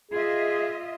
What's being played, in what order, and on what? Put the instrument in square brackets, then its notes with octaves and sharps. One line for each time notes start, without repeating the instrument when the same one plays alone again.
[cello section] F4 D#5 E5 [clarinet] G#4